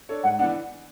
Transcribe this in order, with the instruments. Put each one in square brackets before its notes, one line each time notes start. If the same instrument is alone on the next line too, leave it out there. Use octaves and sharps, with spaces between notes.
[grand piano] D4 A4 C#5
[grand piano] G#2 [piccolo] F#5
[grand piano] E3 B3 D4 [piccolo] F#5